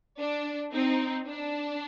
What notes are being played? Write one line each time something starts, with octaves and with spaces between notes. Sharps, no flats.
D4
C4 D#4
D4